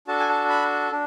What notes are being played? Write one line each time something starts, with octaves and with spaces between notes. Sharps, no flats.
D4 F#4 A4 A5
G#5
A5
B5
D4